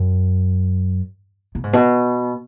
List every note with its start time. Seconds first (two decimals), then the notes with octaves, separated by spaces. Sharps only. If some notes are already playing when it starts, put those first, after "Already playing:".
Already playing: F#2
1.55 B2
1.64 G#2
1.73 B2